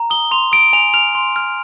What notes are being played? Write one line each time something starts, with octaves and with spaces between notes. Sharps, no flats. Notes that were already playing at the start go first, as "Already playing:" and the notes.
Already playing: A#5
D#6 G7
C6 F7
D#6 D7
G#5 F7
F6 F7
C6
F6